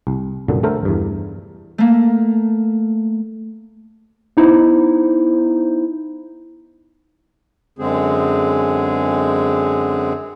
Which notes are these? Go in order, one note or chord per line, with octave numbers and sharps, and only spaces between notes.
C2
C2 F#2 A#2 D3
D3 A3 A4 A#4 C5
E2 G2
A3 A#3
B3 D#4 E4 C5
F#2 D3 G#3 C4 G#4